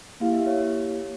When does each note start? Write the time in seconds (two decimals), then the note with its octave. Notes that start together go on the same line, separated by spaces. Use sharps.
0.20 A#3 E4 G4 F5
0.33 E5
0.47 C#5